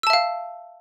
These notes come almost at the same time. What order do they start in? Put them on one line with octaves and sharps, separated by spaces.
E6 A5 E5 F5